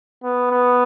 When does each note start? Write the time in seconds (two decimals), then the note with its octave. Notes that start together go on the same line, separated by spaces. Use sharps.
0.24 B3
0.51 B3